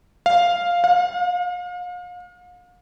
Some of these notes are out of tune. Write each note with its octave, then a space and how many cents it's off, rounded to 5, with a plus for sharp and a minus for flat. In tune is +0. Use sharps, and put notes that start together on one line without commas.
F5 +0
F5 +40